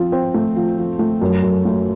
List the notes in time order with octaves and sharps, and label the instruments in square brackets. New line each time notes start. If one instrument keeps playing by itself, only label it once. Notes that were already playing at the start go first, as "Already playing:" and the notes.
Already playing: [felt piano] F3 C4
C4
A3
F3
F3
A3
F#2
F#2
A3